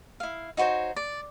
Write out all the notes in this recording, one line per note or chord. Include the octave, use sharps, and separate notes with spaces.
E4 F5
D#4 F#4 C5 C#5
D5